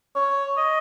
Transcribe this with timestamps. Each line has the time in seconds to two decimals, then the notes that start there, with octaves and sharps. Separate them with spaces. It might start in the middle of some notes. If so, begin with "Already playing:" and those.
0.15 C#5
0.57 D#5